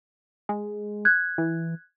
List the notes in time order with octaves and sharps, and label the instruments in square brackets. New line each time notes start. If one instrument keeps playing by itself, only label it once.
[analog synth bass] G#3
[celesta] F#6 G#6
[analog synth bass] E3